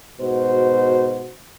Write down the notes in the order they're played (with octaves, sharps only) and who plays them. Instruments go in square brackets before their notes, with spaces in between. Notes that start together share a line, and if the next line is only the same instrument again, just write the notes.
[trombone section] G#2 B2 F#4 C5